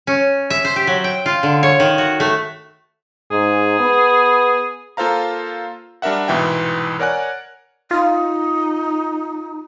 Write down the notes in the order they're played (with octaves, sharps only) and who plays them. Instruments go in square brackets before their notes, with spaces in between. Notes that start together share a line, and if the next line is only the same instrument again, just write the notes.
[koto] C#4
E5
C5
G4
F#3
G5
F4
D3
C#5
D#3
F#4
A3
[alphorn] G#2 [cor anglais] G#4
[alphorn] B3
[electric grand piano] A#3 F4 A4 C5 F5 A#5
G3 D4 A#4 E5 F#5
C2 G#2 B2 E3 E5 G5
A#4 C#5 D5 F#5 G#5 F#6
[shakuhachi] D#4 [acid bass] F4